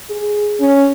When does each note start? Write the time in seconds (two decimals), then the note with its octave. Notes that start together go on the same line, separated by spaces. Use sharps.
0.10 G#4
0.60 C#4